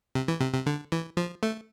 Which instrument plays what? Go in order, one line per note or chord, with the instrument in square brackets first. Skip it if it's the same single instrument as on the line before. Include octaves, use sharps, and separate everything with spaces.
[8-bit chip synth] C3
E3
C3
C3
D3
E3
F3
A3